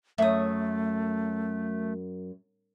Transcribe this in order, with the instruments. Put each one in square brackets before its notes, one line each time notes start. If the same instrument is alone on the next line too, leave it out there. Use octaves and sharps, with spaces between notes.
[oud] F#2 [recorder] A3 [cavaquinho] E5 D#6